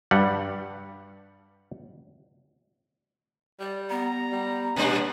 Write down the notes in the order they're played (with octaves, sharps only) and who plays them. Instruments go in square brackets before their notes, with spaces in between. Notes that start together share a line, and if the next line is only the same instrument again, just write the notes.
[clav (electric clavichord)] G2 G3 F#5
[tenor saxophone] G3 [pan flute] D5
[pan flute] B3 [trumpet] A#5
[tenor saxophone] G3
[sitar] A#2 G3 D4 [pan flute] A#3 [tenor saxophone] B3 [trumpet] C#4